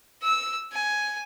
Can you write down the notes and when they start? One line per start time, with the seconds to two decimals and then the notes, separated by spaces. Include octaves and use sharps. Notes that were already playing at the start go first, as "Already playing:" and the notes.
0.23 E6
0.72 G#5